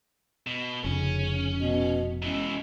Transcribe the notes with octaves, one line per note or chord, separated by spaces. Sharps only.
B2
F1 C#3 C#4
B2 B3
B2 E3 G#3 C#4